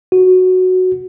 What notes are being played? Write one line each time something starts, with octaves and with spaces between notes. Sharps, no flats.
F#4